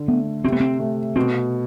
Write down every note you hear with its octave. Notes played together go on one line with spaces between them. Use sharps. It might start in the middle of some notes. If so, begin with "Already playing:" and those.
Already playing: D3
A3 B3
C3 C4
B3
C4
A3
B2 C4